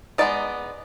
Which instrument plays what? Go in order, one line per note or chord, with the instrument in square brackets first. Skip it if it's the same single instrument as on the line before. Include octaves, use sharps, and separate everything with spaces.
[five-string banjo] G#3 B3 D#4 D5